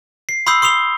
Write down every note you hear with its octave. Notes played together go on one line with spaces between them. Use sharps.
C7
B5 C6 D#6 E6 G6 C7
C6 D#6 C7 F7 G7